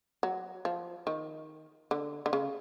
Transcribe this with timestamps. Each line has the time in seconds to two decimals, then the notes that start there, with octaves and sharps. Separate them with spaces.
0.23 F#3
0.65 F3
1.07 D#3
1.91 D3
2.26 D3
2.33 C#3